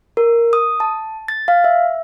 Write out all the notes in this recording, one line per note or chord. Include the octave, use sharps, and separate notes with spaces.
A#4
D#6
A5
A6
F5
E5